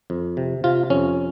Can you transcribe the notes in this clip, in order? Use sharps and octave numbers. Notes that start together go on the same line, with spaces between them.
F2
C3
C3 F4
F2 C#4